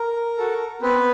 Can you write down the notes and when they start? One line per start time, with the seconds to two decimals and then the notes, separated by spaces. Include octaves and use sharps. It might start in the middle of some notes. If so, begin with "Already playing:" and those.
Already playing: A#4
0.38 F#4 A4
0.82 B3 C4 B4